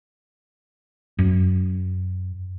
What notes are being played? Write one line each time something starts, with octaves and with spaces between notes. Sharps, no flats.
F#2